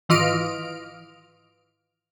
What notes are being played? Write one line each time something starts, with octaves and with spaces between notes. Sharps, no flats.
G#1 E3 F4 D#5 F6 D7